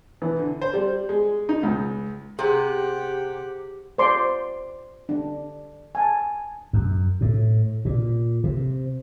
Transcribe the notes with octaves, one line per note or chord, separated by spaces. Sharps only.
E3
D3
C5
G3
G#3
D#4
C#2
C3 G4 G#4 F#5
C5 D5 C6 D6
D4
G#5 A5
F#2
A2
A#2
C3